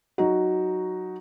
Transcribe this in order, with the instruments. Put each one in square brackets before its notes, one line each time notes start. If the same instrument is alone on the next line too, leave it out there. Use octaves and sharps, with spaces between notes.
[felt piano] F#3 D#4 F#4